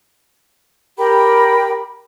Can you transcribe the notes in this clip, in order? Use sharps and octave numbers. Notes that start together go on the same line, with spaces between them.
G4 A#4 G5 B5